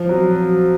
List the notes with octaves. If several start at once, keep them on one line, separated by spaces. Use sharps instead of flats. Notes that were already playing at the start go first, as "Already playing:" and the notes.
Already playing: F3
F#3